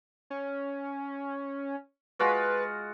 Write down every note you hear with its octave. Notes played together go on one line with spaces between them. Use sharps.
C#4
G#3 F4 F#4 B4